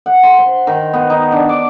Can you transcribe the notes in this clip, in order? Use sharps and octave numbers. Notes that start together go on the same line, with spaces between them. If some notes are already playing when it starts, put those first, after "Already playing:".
F#5
C6
C5
D#3
B3
D#4
D4
D6